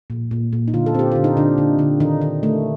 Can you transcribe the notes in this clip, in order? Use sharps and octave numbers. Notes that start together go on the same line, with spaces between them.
A#2
A#2
A#2
D#4
D3 F4
A4
C4 G4
D3 F4
D#4
D3 D4
D3
D3
D#3 D#4
D#3
A3